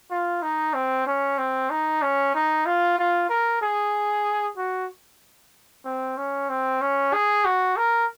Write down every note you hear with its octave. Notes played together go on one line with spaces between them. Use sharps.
F4
D#4
C4
C#4
C4
D#4
C#4
D#4
F4
F4
A#4
G#4
F#4
C4
C#4
C4
C#4
G#4
F#4
A#4